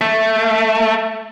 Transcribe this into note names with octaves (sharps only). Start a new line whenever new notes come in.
A3